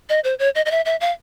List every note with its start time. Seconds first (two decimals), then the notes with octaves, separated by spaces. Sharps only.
0.09 D#5
0.24 C5
0.39 C#5
0.55 D#5
0.65 D#5
0.71 E5
0.85 E5
1.00 F5